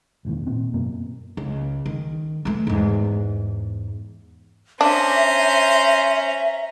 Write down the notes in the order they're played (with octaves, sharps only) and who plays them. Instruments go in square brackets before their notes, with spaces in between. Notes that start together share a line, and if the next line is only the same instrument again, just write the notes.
[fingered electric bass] E1 A1 D#2 A2
A#2 C4
F#2 B2 A#3
[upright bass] C#2
D#3
E3 A3
E2 G#2
[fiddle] C#4 A#5 [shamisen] D4 [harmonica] C5 [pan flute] E5